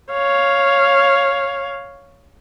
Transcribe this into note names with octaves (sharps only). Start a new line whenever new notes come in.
C#5 F5